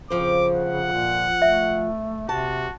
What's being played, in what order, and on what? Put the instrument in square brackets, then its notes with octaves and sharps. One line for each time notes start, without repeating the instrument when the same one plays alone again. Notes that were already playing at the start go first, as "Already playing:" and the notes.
[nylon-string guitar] F2 F3 C5 [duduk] C#3 [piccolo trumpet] D6
[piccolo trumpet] F#5
[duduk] A#2
[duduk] A3 [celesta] E5
[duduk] C3 [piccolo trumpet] F#4 [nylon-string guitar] A5